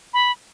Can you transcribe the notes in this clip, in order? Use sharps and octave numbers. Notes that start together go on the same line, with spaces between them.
B5